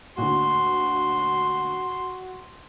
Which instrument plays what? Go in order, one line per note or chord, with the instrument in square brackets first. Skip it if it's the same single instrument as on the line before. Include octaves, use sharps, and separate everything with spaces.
[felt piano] D2 A#2 [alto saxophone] F#4 [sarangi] C6